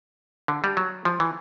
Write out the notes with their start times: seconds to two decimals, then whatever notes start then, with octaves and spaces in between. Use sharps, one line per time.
0.48 D3
0.64 G3
0.77 F#3
1.05 F3
1.20 E3